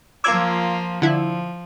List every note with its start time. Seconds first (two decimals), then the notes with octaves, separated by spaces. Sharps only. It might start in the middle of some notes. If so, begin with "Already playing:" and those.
0.24 F3 A#3 F4 D6 E6 G#6
1.02 D3 F3 E4